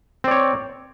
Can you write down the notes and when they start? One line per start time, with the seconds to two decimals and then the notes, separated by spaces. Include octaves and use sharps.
0.24 C4
0.28 D5
0.31 C#5